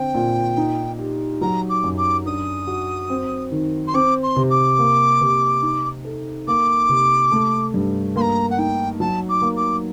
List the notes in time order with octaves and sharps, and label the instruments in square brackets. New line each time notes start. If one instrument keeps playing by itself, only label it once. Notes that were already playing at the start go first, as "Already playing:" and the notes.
Already playing: [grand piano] D3 C4 [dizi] G5
[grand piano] A#2
D#4
G4
[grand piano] F#3 [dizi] A#5
[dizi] D6
[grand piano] F#2
[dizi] D6
[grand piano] D4 [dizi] D#6
[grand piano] F#4
C4
D#3
[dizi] C6
[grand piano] C4 [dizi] D6
[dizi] C6
[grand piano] C3
[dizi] D6
[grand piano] A#3
C3
D#4
A4
[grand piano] A#3 [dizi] D6
[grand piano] C3
A3
G2
[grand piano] A#3 [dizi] C6
[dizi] A#5
F#5
[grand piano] D#4 [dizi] G5
[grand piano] F#3 [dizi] A5
[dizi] D6
[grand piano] A#3
[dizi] D6